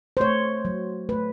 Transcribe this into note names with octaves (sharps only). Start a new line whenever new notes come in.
C5
A3 C#5
F#3
A3 B4